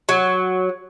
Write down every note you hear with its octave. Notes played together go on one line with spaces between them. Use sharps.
F#3